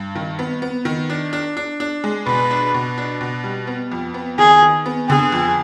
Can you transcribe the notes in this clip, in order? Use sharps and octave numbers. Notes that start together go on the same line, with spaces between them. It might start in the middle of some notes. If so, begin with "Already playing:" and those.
Already playing: G2
D#3
B3
B3
D#3
D4
D4
D4
D4
G#3
B2 B4
D4
B2
D4
B2
G3
B3
F2
B3
D#3 G#4
D#3
B3
D3 G#4
F2